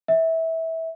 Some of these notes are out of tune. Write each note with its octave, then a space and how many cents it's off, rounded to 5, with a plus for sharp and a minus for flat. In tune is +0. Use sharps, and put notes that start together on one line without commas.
E5 -20